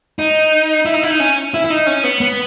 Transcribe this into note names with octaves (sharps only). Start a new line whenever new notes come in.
D#4
E4
D#4
E4
D#4
C#4
E4
E4
D#4
C#4
B3
B3